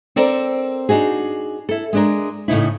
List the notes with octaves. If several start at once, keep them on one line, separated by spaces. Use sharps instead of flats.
C4 A4 A#4 C5 D5
D4 D#4 F#4 G#4
E4 A4
G#3 D4 A#4
A2 C#3 D#4 E4